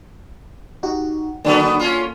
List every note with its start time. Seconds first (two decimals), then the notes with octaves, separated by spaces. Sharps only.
0.83 D#4 F#4 G4
1.45 D3 F#3 A#3 B3 D4 A4
1.79 C#4 F4